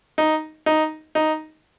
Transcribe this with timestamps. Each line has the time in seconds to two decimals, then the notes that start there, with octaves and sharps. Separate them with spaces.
0.18 D#4
0.66 D#4
1.15 D#4